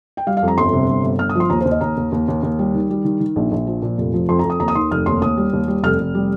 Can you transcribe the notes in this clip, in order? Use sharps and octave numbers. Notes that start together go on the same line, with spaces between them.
G5
G3 F5
F5
F2
A#5
G1 C6
C3
G1
G1
G1 F6
D#6
F3 C6
D#2 A#5
C5
D#2
D#5
D#2 A#5
D#2
D#2
D#2
D#2
G3
D#3
G3
D#3
D#3
A#1
A#1
F3
A#2
F1
F3
F2 C6
A#5
F2
D#6
D#2 A#5
D#6
D#3 C6
F1 F6
D#2 C6
D#2 D#6
G3
D#2
G3
F1 F6
F1
G3